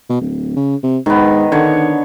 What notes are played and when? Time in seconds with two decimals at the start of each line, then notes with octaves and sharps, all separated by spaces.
0.10 B2
0.21 D1
0.56 C#3
0.83 C3
1.06 G#2 D#3 B3
1.52 D3 D#3 C#5